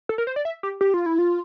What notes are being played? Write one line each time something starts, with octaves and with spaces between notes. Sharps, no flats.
A4
A#4
C5
D5
E5
G4
G4
F4
E4
F4